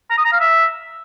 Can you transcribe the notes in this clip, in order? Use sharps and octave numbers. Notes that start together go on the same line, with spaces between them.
A#5
D#6
A#5
F5
E5